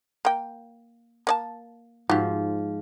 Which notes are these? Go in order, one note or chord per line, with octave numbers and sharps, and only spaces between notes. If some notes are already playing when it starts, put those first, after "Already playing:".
A#3 G5
A#3 D5 A5
G#2 F3 F#4 G4